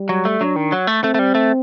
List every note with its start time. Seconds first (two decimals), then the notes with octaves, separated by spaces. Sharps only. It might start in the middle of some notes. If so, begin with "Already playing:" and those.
Already playing: G3
0.09 F#3
0.25 A3
0.40 F#3 D4
0.56 D#3
0.72 F#3
0.87 A3
1.04 A3 C4
1.14 A3
1.19 G3
1.35 A3